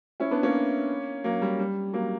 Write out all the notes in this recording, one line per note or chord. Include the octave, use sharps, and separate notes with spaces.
C#4 E4
B3 D4
A#3 C#4
F#3 A#3
G3
G3
F#3 A#3